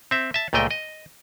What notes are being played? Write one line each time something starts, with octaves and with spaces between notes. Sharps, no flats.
C4 E5
E5 A5
C#2 A#2 A3 D#5 G5
D#5